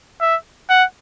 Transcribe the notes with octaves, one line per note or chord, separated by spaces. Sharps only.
E5
F#5